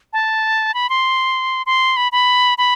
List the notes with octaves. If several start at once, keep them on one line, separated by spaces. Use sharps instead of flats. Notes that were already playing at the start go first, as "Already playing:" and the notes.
A5
B5
C6
C6
B5
B5
B5